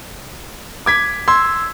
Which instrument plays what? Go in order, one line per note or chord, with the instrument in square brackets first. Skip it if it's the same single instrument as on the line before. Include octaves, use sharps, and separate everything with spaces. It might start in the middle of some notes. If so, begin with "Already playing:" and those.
[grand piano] D6 G#6 B6
[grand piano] C6 [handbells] E6 G#6